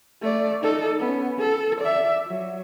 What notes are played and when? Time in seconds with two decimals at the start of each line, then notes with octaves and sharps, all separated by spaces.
0.22 A3 D5
0.63 D#4 A4
1.00 B3 C#4
1.38 A4
1.81 D5 E5
2.27 F#3